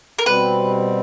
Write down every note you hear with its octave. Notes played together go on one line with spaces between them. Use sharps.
A#4
B2 G3 C4 B4